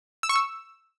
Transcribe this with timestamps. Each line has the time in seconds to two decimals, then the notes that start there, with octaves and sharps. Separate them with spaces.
0.23 E6
0.29 C#6
0.36 E6